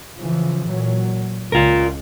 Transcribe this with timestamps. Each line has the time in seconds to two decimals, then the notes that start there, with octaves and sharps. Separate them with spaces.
0.19 C#3 E3 F3
0.69 A#2 F#3
1.52 C#2 F4 A#4